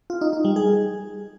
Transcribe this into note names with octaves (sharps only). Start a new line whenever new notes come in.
F4
D#4
D#4
G3
G#4